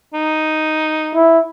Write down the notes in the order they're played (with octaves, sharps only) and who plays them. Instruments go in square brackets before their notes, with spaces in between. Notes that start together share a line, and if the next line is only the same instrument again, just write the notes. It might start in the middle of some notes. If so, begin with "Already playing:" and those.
[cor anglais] D#4
[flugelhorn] E4